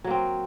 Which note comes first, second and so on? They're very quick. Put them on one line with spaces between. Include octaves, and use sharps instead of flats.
F#3 A#3 C4